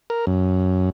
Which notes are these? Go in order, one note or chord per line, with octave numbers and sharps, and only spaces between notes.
A#4
F#2